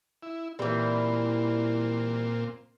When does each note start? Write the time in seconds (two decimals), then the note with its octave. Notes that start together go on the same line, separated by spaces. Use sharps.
0.23 E4
0.59 A#2 E3 G3 C4